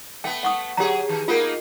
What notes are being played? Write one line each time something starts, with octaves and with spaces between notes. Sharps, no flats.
A3 B3 G5
F#5 C#6 D#6
F#3 G4 G#4 A#5
D#3
A#3 B3 D#4 F4 A#4